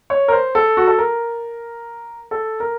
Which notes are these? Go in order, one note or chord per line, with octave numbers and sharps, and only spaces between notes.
C#5
A#4
C5
A4
F#4
A4
A#4
A4
A#4